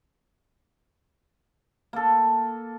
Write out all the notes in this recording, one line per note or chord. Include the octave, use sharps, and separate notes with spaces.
A#3 A4